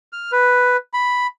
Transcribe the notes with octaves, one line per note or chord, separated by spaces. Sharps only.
F6
B4
B5